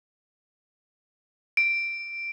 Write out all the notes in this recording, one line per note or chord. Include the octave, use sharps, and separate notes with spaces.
D7